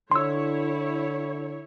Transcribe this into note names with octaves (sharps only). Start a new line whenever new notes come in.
D3 E4 C#5 C6 E6